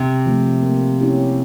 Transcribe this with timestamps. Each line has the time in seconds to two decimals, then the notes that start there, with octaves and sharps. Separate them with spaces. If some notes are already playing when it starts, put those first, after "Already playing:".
Already playing: C3
0.26 F3 A3
0.63 A#3
1.01 C#4 E4 G4